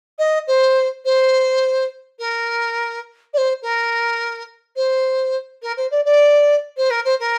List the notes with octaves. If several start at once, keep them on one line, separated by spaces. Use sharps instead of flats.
D#5
C5
C5
A#4
D5
C5
A#4
C5
A#4
C5
D5
D5
C5
A#4
C5
A#4